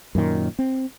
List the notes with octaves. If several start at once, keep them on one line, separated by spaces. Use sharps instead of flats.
F#2 A#2 D#3
C4